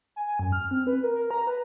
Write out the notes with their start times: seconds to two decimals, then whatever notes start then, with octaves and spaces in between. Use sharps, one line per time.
0.16 G#5
0.39 F#2
0.52 F6
0.71 C4
0.87 B4
1.03 A#4
1.15 A#4
1.31 A#5
1.47 B4